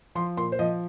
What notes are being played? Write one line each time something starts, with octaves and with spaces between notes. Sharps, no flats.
F3 C6
A#2 C6
C5
F3 D#5